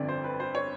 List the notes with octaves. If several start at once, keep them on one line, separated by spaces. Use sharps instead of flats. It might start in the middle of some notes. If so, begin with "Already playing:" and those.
Already playing: G1 F2 D3 D5
C5
B4
C5
C#5